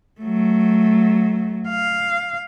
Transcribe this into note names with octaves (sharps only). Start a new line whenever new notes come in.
F#3 A3
F5